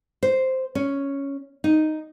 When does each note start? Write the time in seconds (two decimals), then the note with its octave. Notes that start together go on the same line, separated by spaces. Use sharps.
0.23 C5
0.75 C#4
1.64 D#4